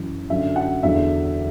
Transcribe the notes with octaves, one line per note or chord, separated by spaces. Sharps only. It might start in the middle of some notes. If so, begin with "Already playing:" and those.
Already playing: F#2 E3
F#2 D3 F#3 E5
F#5
E2 D3 F#3 E5